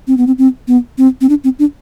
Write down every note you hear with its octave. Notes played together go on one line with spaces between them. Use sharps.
C4
B3
C4
C4
B3
C4
C4
D4
C4
D4